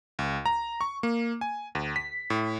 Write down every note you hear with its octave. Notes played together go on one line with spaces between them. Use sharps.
C#2
A#5
C#6
A#3
G#5
D2
B6
A2